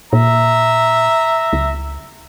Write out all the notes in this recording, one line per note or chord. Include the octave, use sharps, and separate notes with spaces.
A#2 E5 A#5
C#2